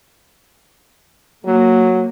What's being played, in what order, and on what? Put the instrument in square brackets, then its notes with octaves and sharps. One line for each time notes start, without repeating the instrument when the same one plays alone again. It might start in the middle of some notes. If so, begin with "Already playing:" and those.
[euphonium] F#3 [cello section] A#3